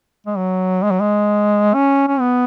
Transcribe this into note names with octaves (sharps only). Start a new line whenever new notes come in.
G#3
F#3
G#3
F#3
G#3
C#4
C#4
B3